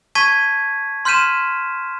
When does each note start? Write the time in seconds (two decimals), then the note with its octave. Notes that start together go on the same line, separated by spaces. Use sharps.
0.15 A5 C#6 G#6 B6 D#7
1.05 C6 F6 G6 B6 D#7 E7